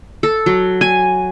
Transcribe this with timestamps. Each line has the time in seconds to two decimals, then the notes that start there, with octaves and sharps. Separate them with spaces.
0.23 A4
0.46 F#3
0.81 G#5